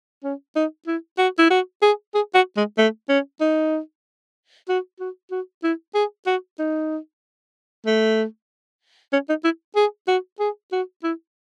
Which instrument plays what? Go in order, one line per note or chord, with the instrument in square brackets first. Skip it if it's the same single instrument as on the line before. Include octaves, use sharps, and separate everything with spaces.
[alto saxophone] C#4
D#4
E4
F#4
E4
F#4
G#4
G#4
F#4
G#3
A3
C#4
D#4
F#4
F#4
F#4
E4
G#4
F#4
D#4
A3
C#4
D#4
E4
G#4
F#4
G#4
F#4
E4